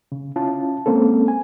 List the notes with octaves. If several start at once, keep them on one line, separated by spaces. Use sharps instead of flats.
C#3
C#4 E4 F4 A5
G#3 A#3 C4 C#4 A4
G#5